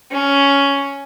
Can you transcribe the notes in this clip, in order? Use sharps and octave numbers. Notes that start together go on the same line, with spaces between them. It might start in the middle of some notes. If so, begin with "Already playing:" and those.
C#4